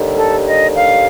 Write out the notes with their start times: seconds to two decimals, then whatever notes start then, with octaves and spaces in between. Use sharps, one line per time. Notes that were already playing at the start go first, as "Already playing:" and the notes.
Already playing: D#2 D3 G3
0.16 A4
0.46 D#5
0.76 F5